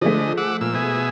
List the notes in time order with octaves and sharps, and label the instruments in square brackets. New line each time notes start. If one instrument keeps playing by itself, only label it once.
[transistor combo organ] D3 D#5 [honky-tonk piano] F3 G#3 A3
[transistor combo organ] F#5 D6 E6
A#2 E6
B2 G#4 E5